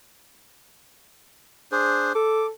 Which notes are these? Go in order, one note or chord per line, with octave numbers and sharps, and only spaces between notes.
D4 G#4 C5
A4 D6